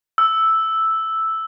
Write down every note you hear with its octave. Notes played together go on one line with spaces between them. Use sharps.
E6